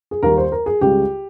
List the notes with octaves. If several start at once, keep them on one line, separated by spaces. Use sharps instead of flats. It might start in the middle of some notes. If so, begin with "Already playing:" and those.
G#4
D#2 D#3 G3 A#3 A#4
C5
A#4
G#4
C#2 C#3 G3 G4